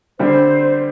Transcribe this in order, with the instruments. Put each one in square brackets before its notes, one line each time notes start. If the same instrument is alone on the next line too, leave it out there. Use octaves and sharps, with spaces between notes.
[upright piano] D3 G3 C4 [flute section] C5